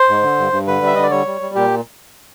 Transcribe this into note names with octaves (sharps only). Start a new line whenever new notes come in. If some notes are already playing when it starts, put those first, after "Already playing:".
Already playing: C5
G#2
D3
G2
G2
D3 B4
G3 E5
D3 D#5
D5
G3 C#5
G3
G3
A#2 G4